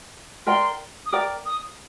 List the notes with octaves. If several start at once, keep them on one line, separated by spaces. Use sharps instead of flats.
A#4 D5 G5 A#5 C6
D#6
A#4 D5 G5 A#5 D6
D#6